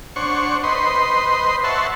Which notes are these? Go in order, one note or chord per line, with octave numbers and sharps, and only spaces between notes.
D4 C5 C#5 F#5 C#6
B4 C5 D#5 C6
C#5 E5 F#5 A5 C6